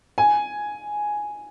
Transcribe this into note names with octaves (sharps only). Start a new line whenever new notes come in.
G#5